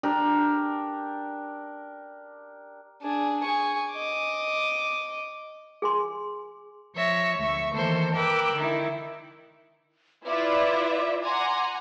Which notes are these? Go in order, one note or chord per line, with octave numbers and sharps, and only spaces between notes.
D4 G4 A#4
D4 G#4
G#4 C#6
D#5 D6
G#4 G#5 C6
F3 C#5 E5 A#6
D2 E5 C#6
D#3 E3 A#3 A4 C5
A#4 B4 G5 D6 E6 F#6
D3 D#3 D#4 E4
E4 F4 B4 D5 E5 D6
F#5 G#5 A#5 C6 D6